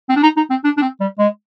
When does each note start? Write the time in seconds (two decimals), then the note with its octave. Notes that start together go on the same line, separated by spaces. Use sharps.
0.09 C4
0.16 D4
0.23 D#4
0.37 D#4
0.50 C4
0.64 D4
0.77 D4
0.82 C4
1.01 G3
1.19 G#3